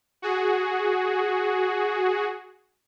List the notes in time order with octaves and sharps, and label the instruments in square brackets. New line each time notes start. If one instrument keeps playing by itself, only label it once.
[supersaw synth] F#4 G#4